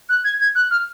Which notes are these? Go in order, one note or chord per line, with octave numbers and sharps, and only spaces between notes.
F#6
G#6
G#6
F#6
F6